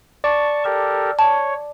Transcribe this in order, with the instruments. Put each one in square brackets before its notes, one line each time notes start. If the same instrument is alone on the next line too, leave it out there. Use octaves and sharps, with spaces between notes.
[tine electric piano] D5 [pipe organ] A5 C#6
[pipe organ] G4 A4 A#4
[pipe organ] C#5 [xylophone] A5